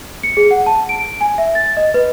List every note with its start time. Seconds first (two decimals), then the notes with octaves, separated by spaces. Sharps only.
0.23 C#7
0.37 G#4
0.51 F#5
0.66 A5
0.89 D7
1.21 G#5
1.38 E5
1.55 A6
1.77 D#5
1.94 B4